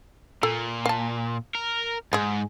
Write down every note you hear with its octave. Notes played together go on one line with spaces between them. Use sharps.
A#2 A4
F5 A5
A#4
G#2 G#3 G#4